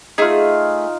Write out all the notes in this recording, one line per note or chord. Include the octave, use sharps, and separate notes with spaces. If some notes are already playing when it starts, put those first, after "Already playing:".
A3 D#4 F4 G#4